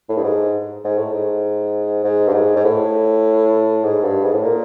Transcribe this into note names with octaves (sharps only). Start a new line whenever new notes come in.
A2
G2
G#2
G#2
A2
G#2
G#2
G2
G#2
G#2
A2
G#2
G2
G#2
A2
A#2